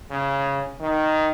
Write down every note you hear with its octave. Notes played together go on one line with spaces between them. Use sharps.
C#3
D#3